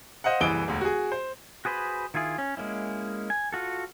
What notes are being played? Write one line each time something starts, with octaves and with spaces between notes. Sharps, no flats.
C5 D#5 F5 F#5
F#1 C2 E3 D#6 D7 G7
E1 D2
F#4 G#4
C5
F#4 G#4 B4 C5 B5
D#3 E4 F4 G#4
C#4
G#3 A#3 C#4 E4
G#5
F4 F#4 A4